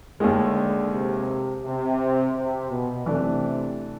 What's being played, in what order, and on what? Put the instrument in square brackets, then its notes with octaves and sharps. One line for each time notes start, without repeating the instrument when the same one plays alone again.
[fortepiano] D#2 D#3 G#3 [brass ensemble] D3
[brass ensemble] C3
C3
C3
B2
[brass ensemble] C3 [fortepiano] E3 A3 D4